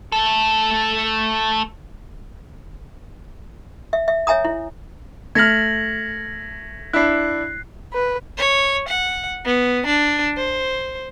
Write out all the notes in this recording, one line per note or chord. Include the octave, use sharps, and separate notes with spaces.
A3 A4
E5
E5
C#5 E5 G#5 A#5 D#6
E4
A3 F6 G#6 A#6 F#7
D4 E4 F#6 C7
B4
C#5
F#5
B3
D4
C5